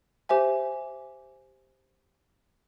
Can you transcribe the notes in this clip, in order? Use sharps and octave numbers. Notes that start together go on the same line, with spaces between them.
G4 C5 E5 G#5